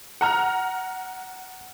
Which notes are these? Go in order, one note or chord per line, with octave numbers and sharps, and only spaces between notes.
F#5 A#5 F6